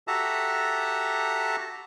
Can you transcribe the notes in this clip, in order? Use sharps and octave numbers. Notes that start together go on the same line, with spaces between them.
F#4 G4 A4 E5 A5 A#5